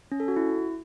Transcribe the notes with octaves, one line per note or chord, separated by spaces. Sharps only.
C#4
A4
F#4
E4